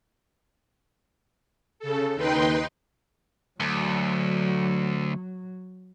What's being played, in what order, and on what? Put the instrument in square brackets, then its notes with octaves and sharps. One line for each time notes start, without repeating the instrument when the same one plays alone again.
[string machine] C#3 A4
D#2 D#4 B4 G5 C6
[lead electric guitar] D2 [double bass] F#3